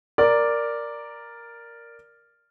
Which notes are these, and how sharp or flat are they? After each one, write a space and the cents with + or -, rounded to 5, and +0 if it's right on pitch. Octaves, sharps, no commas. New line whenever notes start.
A#4 +0 D5 +0